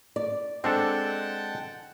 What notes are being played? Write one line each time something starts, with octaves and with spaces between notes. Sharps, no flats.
D5
G#3 C4 D4 A4 F#5 G5 A5